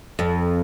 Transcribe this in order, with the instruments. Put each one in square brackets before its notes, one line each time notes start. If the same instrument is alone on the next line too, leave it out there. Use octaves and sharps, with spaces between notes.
[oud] F2